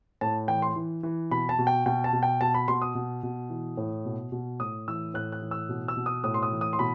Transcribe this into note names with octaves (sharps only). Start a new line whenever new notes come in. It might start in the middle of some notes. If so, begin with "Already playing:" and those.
A2 A5
E3 G5
C6
E3
E3
B2 B5
A5
B2
G5
B2 G5
A5
B2
G5
B2 A5
B5
B2 C6
D#6
B2
B2
E3
A2
B2
B2
A2 D#6
E3 E6
A2 F#6
F#6
E3
E6
B2
E6
B2
D#6
A2 D#6
C6
D#6
E3
D#6
C6
B2 B5